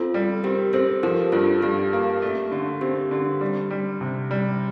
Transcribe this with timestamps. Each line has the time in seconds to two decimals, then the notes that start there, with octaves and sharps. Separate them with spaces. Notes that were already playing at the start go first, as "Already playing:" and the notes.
Already playing: C4 F4 A4
0.14 G3
0.44 C4 G4 A#4
0.73 C4 A4 C5
1.03 F3 G4 A#4
1.32 G2 F4 A4
1.62 G2 G4
1.93 A#3
2.22 A3
2.52 D3
2.81 C4 G4
3.11 D3
3.41 G3
3.71 G3
4.01 C3
4.31 G3